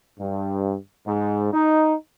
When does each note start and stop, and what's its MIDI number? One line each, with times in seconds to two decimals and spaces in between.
0.18 0.75 43
1.06 1.50 44
1.52 1.94 63